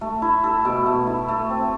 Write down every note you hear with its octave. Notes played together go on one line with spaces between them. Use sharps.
A3
E4
A4
B2
A3
E4
A3
C4